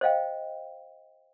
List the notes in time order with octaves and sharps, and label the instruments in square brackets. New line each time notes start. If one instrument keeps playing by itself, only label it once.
[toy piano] C5 D#5 F5 G5